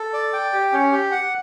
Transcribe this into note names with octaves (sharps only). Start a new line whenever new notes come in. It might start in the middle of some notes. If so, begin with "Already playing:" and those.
Already playing: A4
D5
G5
G4
C#4
G4
F#5